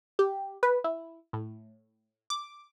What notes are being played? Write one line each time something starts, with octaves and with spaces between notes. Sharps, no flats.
G4
B4
E4
A2
D6